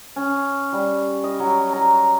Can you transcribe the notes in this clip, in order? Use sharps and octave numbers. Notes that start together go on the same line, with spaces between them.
C#4
G3
D#5
F#3
A#5